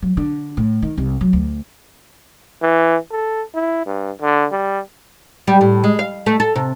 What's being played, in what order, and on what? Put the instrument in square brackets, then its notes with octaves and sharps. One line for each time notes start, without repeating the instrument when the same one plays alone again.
[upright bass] F#3
D3
A2
D#3
C2
F#3
D2
[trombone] E3
A4
E4
G2
D3
G3
[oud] G3
A2
G#3
F5
A3
A4
C3